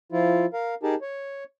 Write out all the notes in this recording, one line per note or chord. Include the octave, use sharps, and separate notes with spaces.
F3 E4 F4
A#4 F5
D#4 G4 G#4 A#4 A5
C#5